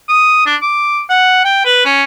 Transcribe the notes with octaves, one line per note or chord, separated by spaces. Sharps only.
D#6
D4
D6
F#5
G5
B4
C#4